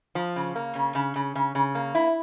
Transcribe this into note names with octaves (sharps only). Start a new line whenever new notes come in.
F3
C#3
A#3
C#3
C#3
C#3
C#3
C#3
A#3
E4